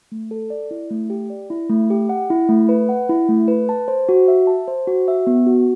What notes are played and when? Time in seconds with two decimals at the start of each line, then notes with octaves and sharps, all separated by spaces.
0.12 A3
0.31 A4
0.50 D5
0.71 E4
0.91 A3
1.10 G4
1.30 D5
1.50 E4
1.69 A3
1.90 G4
2.09 F#5
2.30 E4
2.49 A3
2.69 B4
2.89 F#5
3.09 E4
3.29 A3
3.48 B4
3.69 A5
3.88 C5
4.09 F#4
4.28 E5
4.47 A5
4.68 C5
4.87 F#4
5.08 E5
5.27 B3
5.47 F#4